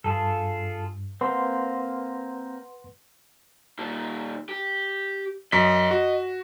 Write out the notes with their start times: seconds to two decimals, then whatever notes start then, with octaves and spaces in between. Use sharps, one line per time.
0.04 G2 F4 G#4 A4
1.21 A#3 C4 B4 F#5 C6
3.79 A#2 D#3
4.49 G4
5.52 F#2 D#5 B6
5.91 F#4